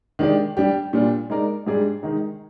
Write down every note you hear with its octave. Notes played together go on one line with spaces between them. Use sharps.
D#3 G#3 D4 G4 D5
G3 D4 G4
A#2 G3 D4 F4
G#3 D#4 A#4 D5
G#2 G3 D4 G#4 D5
D#3 G#3 D#4